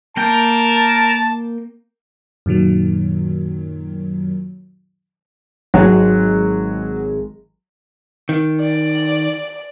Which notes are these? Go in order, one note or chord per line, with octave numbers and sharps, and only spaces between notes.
A#3 A#4 G5 A5
F#2 A#2 D#3 F#3
G#1 F#3 G#3
D#3
D5